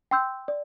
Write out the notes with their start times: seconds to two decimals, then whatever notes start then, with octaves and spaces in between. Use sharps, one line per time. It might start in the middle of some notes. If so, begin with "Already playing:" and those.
0.11 G5 C6 E6 G6
0.48 D5